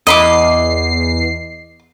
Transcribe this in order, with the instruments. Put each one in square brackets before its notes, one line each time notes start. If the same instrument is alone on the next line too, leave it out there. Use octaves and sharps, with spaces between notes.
[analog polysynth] E2 C7 [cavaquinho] D#5 B5 D6